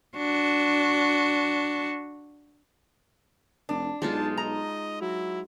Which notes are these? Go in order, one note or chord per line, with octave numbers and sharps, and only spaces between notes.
D4 F#4
F1 D4
B1 G#3 D#4 F4 A5
D#5 A#5
F#3 E4